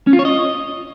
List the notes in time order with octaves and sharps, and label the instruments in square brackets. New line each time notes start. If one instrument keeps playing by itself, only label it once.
[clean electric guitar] C#4
F4
C#5
D#5